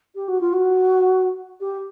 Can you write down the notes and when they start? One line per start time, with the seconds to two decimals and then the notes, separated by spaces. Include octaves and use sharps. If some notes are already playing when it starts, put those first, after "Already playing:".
0.15 G4
0.28 F#4
0.40 F4
0.53 F#4
1.60 G4